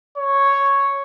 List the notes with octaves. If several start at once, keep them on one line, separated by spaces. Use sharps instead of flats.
C#5